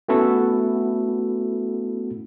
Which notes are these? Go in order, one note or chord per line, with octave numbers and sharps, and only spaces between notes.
A3 B3 C#4 E4 F#4 A4